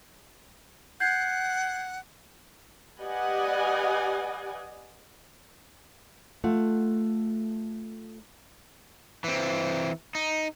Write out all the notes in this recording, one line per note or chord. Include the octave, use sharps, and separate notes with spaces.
F#5 G6 G#6 C7
G4 B4 D5 D#5 F#5 G#5
A3 F4 F#5
E3 C4
D#4